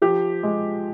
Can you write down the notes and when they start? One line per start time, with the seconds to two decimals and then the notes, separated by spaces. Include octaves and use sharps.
0.02 F3 G4
0.43 G#3